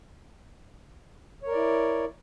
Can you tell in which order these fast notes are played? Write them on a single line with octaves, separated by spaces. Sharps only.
C#5 A#4 D5 E4